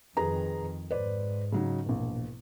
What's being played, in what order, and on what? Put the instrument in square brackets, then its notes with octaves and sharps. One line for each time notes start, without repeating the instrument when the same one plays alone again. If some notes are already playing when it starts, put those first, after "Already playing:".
[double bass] F2 D#3 [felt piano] G#4 B4 A#5
[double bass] G#2 [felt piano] B4 C5 D5
[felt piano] C#3 F#3 D#4
E1 A#1